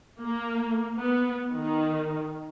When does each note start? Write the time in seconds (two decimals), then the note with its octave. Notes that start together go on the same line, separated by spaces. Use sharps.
0.23 A#3
0.98 B3
1.57 D#3